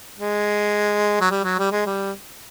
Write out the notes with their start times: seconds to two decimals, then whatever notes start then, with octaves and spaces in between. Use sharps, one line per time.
0.18 G#3
1.21 F#3
1.31 G3
1.44 F#3
1.59 G3
1.72 G#3
1.86 G3